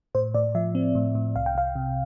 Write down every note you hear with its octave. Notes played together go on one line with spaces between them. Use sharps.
A2 C5
A2 D5
F3 E5
C4
A2
A2
C2 F5
G5
C2 F5
C3